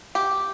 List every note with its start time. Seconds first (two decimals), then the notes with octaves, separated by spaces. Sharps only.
0.15 G4